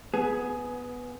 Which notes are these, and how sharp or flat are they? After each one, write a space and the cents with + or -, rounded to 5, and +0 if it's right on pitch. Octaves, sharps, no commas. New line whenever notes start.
B3 +0 G#4 +15